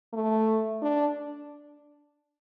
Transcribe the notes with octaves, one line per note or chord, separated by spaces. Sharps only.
A3
D4